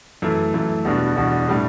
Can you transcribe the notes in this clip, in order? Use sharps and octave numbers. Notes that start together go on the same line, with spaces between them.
F#2 E3 A3
F#2 E3 A3
E2 B2 G3 D4 F#4
E2 B2 G3 D4 F#4
A2 G3 D4